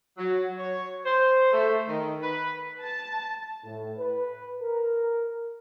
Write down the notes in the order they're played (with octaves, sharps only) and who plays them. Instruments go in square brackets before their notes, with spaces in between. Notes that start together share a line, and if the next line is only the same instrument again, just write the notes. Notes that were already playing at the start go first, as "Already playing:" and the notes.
[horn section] F#3
C#5
C5
A3
D#3
B4
[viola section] A5
[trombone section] A2
B4
A#4